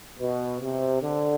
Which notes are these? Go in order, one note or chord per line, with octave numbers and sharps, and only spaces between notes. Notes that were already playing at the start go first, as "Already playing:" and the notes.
B2
C3
D3